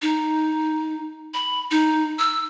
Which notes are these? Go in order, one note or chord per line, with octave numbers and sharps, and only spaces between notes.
D#4
B5
D#4
E6